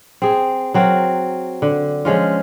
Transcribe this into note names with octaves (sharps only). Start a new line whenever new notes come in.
C4 G#4
F#3 C4 F#4 A#4
D3
F3 G#3 C#4 F4